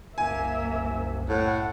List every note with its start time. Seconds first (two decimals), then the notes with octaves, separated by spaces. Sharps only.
0.18 F#1 C2 A#3 E5 G#5
1.29 A2 F#5